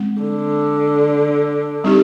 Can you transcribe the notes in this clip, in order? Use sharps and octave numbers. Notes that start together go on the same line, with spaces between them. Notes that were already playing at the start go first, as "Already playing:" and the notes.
Already playing: G#3 C4
D3
G3 C4 D#4 G4